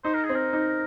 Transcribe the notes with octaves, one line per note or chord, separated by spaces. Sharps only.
D#4 C5
A#4
G#4
C4
A#4
D#4